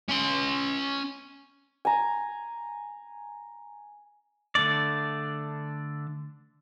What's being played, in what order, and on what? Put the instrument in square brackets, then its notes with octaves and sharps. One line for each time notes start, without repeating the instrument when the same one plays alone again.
[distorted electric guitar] C#4 C6
[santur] G#5 A#5
[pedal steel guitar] D3 A3 D4 D5